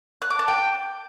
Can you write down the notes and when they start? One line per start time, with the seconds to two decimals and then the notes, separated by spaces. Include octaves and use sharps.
0.22 F#6
0.30 D6
0.39 A5
0.48 G5